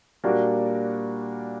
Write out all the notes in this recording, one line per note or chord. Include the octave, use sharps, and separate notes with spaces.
A#2 G3 A#3 D4 F#4